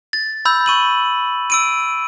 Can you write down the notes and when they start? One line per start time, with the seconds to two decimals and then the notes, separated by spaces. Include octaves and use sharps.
0.13 A6
0.45 B5 E6 G6
0.66 C#6 D#7 F#7
1.50 E6 D7 D#7